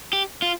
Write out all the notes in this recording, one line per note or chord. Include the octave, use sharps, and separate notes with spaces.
G4
F4